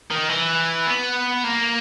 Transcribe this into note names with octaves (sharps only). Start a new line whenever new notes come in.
D#3
E3
B3
A#3